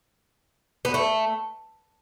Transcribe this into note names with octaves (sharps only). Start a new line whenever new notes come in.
B3
A3